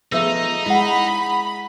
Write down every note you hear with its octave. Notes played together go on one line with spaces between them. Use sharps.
F3 A3 B3 D#4 G#4 E5 E6
G#3 E4 F#5 B5